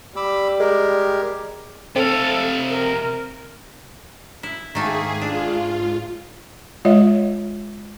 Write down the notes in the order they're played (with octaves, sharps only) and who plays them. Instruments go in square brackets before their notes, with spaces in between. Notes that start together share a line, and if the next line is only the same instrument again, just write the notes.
[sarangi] G3 [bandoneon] B5 D6 E6
[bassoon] G#3 [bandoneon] G4 A#4
[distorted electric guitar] C3 F5 [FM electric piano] C4 [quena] A4
[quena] A#4
[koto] E4
[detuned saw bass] G#2 [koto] D#3 A3 A#3 [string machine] G#4
[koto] D4 [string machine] F4
[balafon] G#3 F4 C#5 D#5 E5